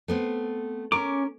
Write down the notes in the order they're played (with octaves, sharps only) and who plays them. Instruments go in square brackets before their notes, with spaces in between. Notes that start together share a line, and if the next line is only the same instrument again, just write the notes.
[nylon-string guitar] A3 B3 C4
[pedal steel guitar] C#4 C#6 D6 [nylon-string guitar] A#4